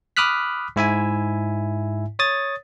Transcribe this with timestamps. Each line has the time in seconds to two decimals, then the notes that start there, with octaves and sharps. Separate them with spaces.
0.17 B5 D6 D#6 F6 F#6 B6
0.76 G#2 E4 E5 G#5
2.19 C#5 D#6 A6